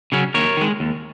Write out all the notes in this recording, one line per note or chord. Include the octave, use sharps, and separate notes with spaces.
C#3 F#3 C#4
D#2 A#4 C#5
D#3 G#3
D#2